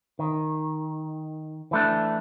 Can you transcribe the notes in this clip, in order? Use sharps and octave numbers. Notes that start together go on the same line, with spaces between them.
D#3
E3 A3 D4